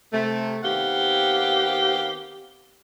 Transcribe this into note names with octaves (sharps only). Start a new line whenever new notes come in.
C3 A3
D#3 B3 C4 G4 F5 F#5